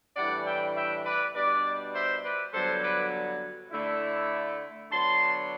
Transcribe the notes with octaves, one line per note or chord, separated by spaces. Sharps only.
A2 E3 G3 D4 D5 F#5
E5 G5
E5 G5
B4 D5
B2 G3 D4 B4 D5
C5 E5
B4 D5
G2 D3 F#3 B3 A4 C5
B4 D5
D3 A3 E4
D3 F#3 B3 A5 C6